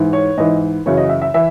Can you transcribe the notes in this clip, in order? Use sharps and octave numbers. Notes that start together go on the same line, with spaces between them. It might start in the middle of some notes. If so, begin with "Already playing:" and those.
Already playing: G#2 E3
C#5
G#2 E3 D#5
F#2 C#3 E3 C#5
D#5
E5
E5
E3 E5